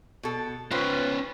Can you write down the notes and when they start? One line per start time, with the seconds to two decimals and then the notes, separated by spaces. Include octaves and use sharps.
0.23 B2 A4
0.71 C#3 C#4 F4 B4 C5